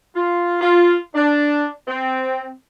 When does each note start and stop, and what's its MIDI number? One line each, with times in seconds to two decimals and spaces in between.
0.16 0.61 65
0.61 0.96 65
1.14 1.67 62
1.87 2.48 60